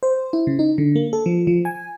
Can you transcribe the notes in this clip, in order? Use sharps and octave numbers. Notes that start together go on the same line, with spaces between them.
C5
E4
C#3
D#4
D3
A#3
A4
F3
F3
G#5